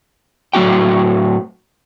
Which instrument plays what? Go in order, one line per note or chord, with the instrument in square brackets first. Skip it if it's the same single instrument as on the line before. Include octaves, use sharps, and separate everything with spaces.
[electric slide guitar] A2 F#3 C#4 F#4 G5